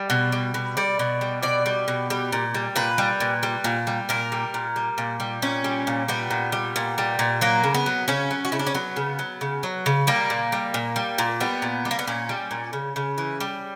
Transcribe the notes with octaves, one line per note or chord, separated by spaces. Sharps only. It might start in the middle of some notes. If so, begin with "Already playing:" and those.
Already playing: G3
B2
G3
B2
G3 D5
B2
G3
B2 D5
G3
B2
G3
A#2
G3
A#2 B4
G3
A#2
G3
A#2
G3
A#2 A#4
G3
A#2
G3
A#2
G3
A#2 C#4
G3
A#2
G3 B3
A#2
G3
A#2
G3
A#2
F#3 A#3
C#3
B3
F#3
C#3 C#4
F#3
F#4
C#3 E4
D4
C#4
F#3 B3
C#3
F#3
C#3
F#3
C#3
G3 A#3
A#2
G3
A#2
G3
A#2
G3 B3
A#2
G3
A#3
B3
A#2 C#4
G3
A#2
C#3
C#3
E3
G3